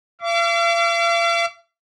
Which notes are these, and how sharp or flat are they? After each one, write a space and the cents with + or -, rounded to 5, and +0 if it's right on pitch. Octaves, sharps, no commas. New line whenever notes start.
F5 -45 D6 -35